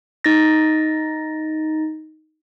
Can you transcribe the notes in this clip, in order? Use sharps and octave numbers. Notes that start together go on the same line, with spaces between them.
D#4 A6 A#6